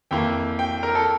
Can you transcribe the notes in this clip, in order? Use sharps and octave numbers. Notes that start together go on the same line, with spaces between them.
F2 E3 A#3 G5
G5
A#4
A4